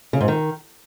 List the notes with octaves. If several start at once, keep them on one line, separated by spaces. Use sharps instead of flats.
C#3
G#2
D#3